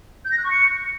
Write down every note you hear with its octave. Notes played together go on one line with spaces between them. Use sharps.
G6
A#6
F#6
C#6
C#7